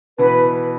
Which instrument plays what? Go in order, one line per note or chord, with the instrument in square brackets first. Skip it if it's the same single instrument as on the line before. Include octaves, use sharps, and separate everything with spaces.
[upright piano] B2 E3 [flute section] B4